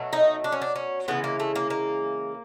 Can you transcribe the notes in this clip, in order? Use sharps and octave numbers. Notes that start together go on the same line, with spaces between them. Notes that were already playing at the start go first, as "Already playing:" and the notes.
Already playing: B2 F#3 A3
D#4
D4
C#4
D4
C#4
C#3 E3 G#3 B3
A#3
A3
A#3
A#3